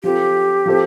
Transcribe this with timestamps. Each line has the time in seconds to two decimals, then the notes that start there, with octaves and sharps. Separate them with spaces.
0.04 F3 C4 F4 G4 A4
0.66 F3 C4 A4 C5